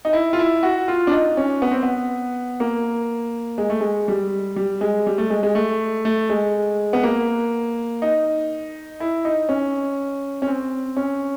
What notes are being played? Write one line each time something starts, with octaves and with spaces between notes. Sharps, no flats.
D#4
E4
F4
E4
F#4
F4
D4
D#4
C#4
B3
C4
B3
A#3
G#3
A3
G#3
G3
G3
G#3
G3
A3
G#3
G#3
A3
A3
G#3
B3
A#3
D#4
E4
D#4
C#4
C#4
C4
C#4